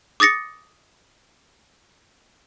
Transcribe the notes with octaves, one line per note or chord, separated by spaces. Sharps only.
D6 D#6 A6 A#6 C#7